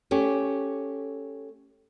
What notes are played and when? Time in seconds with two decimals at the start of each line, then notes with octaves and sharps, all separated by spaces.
0.11 A3 C#4 G4